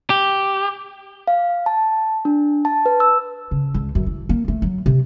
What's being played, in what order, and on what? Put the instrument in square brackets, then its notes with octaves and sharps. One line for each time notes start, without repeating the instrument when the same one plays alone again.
[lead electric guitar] G4
[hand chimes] F5
A5
D4
A5
B4
E6
[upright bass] C#3
C#2
F#2
E3
A#3
A3
F#3
C3